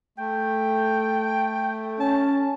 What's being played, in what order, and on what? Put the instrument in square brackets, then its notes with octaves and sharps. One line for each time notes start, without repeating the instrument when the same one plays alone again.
[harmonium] A3 [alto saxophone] G5
[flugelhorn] C#4 [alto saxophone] A5